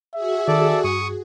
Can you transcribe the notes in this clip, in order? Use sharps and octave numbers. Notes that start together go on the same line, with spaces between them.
F#4 G#4 E5
D#3 A4 D5
G2 C#6 D#6